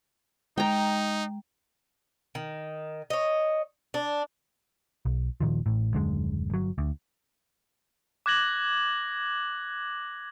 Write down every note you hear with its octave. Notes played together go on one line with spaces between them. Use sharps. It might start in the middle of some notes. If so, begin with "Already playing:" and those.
G#3 D#4 G5 A#5
D#3
C#5 D#5
D4
B1
D#1 A#2 D#3 F3
A1 A2
D#1 F#2 D3 G#3
G1 F#3
D2
D6 F#6 G#6 A#6 F#7